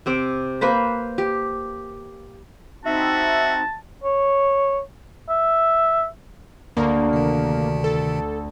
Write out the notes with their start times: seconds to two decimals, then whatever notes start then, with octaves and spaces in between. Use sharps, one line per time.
0.06 C3 C4 D6
0.61 A#3 B4 C5 B5
1.18 G4
2.85 C4 D#4 F#4 E5 A5
4.04 C#5
5.29 E5
6.77 D2 A#3
7.13 C3 D#3
7.84 A4